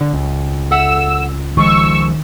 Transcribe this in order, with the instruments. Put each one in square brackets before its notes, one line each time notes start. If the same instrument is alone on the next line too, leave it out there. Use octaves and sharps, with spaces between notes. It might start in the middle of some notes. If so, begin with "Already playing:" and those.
[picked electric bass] D3
C#2
[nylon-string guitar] A4 E5 F#5 [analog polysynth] E6
[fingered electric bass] D#3 [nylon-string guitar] F3 G#3 [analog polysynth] C#6 E6